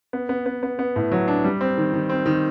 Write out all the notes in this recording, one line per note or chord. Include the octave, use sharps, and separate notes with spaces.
B3
B3
B3
B3
B3
A2
F#3
D4
G3
C4
D#3
D#3
C4
D#3